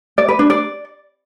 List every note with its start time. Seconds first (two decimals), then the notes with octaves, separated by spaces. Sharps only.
0.18 D5
0.29 B4
0.39 D4
0.50 D5